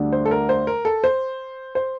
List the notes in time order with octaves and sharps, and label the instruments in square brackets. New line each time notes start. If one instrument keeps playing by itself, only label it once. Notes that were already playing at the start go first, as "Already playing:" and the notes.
Already playing: [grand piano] D2 D3 G3 D4
[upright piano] C5
A4
A#4
C5
A#4
A4
C5
C5